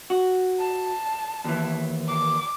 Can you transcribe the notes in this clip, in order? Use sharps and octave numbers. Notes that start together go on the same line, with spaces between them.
F#4
A5
D#2 E3
D6